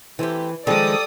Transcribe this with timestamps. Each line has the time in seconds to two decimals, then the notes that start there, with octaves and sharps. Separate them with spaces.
0.19 E3 A3 C4 E4 G4
0.67 D#3 F3 G3 G#3 A4 D5 D#6